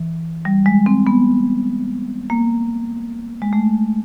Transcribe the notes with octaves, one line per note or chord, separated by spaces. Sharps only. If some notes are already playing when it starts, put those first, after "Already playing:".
Already playing: E3
G3
G#3
C4
B3
A#3
G#3
A3